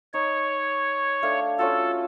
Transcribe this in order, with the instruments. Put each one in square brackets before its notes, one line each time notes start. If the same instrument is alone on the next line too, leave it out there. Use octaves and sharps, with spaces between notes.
[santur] D#4 [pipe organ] C#5
[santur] A3 D4 F5
[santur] C#4 F4 F#4 [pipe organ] A4